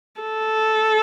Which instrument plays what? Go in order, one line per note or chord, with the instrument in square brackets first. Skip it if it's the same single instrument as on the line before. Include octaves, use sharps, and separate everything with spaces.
[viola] A4